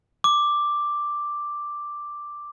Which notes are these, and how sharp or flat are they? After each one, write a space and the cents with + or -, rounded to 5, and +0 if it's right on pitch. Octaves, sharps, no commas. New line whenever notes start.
D6 +5